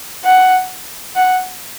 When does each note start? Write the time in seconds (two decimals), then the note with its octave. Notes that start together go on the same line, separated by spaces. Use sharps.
0.24 F#5
1.16 F#5